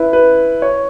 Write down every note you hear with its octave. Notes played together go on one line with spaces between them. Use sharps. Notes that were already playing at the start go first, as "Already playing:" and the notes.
Already playing: E4 B4
B4
C#5